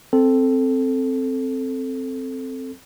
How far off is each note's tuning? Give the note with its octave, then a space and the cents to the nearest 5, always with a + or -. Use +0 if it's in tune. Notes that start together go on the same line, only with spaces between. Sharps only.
C4 +0 A4 +0